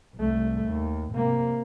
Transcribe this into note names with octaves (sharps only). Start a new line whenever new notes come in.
C2 A3
D#2
C3 A#3